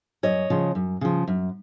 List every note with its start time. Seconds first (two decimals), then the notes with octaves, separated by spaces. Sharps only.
0.23 F#2 C#5 D#5
0.50 C#3 F3
0.75 F#2
1.01 C#3 F3
1.27 F#2